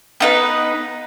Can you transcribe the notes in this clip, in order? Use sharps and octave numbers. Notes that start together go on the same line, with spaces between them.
B3 D#4 B4